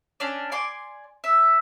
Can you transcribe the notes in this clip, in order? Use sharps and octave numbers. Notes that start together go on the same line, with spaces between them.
C#4 D4 D5
D5 G#5 C6 D6
E5